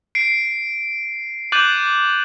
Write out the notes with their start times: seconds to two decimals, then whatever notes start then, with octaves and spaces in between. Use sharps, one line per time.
0.15 C7 D7
1.52 D6 F#6 G6 A6 D#7 F#7